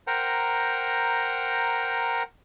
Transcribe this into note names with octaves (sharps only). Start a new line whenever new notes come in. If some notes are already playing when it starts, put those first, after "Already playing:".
A#4 C5 F#5 G5 A#5